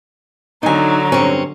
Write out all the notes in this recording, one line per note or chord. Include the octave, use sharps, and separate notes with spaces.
D3 F#3 D#4 G#5 A#5
G2 C4 C#4